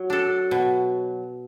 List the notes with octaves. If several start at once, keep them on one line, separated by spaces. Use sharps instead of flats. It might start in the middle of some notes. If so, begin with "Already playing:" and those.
Already playing: F#3
D4 A4
B2